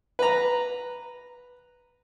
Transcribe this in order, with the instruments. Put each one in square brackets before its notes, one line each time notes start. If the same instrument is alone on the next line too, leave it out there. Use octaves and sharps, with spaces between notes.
[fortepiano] B4 A#5